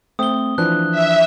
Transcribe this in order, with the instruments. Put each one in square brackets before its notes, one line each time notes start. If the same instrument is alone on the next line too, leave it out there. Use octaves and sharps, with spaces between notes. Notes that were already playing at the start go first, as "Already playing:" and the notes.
[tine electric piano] A3 C4 [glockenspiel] D#6 G7
[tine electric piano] E3 F3 D4 [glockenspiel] F#6
[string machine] E5